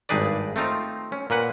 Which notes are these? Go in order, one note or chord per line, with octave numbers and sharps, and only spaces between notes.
G#1 G2 D#4 G#4 B4 D5
A3 C4 D#4 F4
C#4
A#2 A#3 B4 F#5